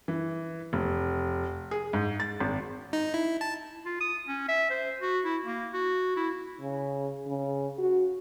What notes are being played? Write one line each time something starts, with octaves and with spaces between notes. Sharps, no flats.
E3
F1
G#4
G#2
A6
G#1
D#4
E4
A5
F4
D#6
C#4
E5
C5
F#4
E4
A#3
F#4
E4
C#3
C#3
F#4